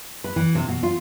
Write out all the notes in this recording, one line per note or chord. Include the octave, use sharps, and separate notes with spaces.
B4
E3
C3
B2
F4